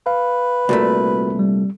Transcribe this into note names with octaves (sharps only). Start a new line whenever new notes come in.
B4 F5
C2 A#2 A3 F#4 A#4
G3